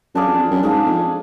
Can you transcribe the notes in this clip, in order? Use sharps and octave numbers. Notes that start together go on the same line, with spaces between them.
F#2 D4 G#4 D5 F5
F2
F2
F#2
G#2 D4 G#4 D5 F5
F2